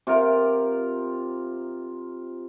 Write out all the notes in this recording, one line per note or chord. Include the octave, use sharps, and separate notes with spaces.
C3 F4 A#4